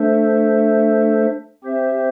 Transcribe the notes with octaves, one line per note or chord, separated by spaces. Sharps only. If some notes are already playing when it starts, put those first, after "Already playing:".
Already playing: A3 D4 A4 C5 E5
C4 G4 C5 E5